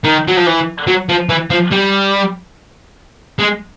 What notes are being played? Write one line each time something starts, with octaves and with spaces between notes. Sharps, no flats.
D#3
F#3
F3
E3
F#3
F3
E3
F3
G3
G#3